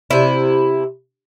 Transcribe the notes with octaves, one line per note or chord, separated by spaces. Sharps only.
C3 E4